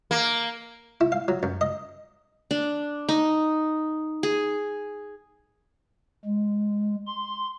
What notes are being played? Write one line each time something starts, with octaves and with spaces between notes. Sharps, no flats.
A#3
E4
F5
F#3
F#2
D#5
D4
D#4
G#4
G#3
C6